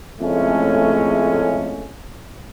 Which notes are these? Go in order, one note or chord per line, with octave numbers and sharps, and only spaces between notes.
F2 A2 C#3 G#3 A3 C#4